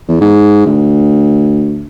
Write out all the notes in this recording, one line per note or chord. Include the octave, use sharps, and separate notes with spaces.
E2
G#2
D2